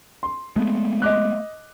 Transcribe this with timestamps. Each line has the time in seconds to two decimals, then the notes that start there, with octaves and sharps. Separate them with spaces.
0.23 C6
0.56 G#3 A3 B3
1.02 D#5 D6 F#6